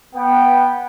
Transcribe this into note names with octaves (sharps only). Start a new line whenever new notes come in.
B3 G5